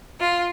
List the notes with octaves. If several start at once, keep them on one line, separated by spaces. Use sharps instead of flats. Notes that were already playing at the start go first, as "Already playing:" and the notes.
F4